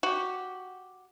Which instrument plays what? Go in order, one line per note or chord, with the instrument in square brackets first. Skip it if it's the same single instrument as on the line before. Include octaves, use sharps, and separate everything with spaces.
[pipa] F#4 G4